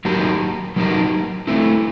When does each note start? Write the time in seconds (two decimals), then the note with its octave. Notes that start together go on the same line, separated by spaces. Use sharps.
0.05 F#3 A#3 D#4 G4 A#4
0.76 F#3 A#3 D#4 G4 A#4
1.47 A3 C4 E4